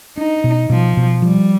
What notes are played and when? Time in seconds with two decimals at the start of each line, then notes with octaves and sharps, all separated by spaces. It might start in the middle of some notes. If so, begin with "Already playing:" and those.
0.17 D4 D#4
0.44 B2
0.70 B2 F3
0.97 B2
1.22 F3 G3